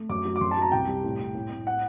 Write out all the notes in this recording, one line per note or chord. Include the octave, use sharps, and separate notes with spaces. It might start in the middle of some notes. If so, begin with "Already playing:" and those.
Already playing: A3
F#2 D6
F#3
D6
F#2 C6
A5
F#3
A#5
C2 G5
G3
A2
A2
A2
A2
F#5